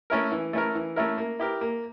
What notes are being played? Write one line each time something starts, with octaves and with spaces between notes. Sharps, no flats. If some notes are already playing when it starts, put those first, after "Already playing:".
A3 C#4 E4 A#4
E3
A3 C#4 E4 A#4
E3
A3 C#4 E4 A#4
A#3
E4 G4 A#4
A#3